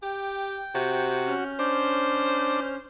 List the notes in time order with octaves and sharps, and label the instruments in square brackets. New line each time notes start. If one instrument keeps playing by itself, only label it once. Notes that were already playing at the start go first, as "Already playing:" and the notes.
[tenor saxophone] G4 [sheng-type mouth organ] G5
[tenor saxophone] C3 [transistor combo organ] F#4
[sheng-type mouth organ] C#4 F6 G6
[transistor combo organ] D4 [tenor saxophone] C5